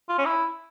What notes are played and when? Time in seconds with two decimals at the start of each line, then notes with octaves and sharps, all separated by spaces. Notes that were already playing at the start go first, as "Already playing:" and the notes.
0.09 F4
0.18 C#4
0.26 E4